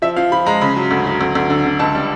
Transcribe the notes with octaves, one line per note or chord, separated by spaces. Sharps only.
F3 E5
F3 F5
F3 B5
G#3 A#5
C#3 B5
F#3
D2
F#3
D2
D2
D3
D3
C#2 A5
G3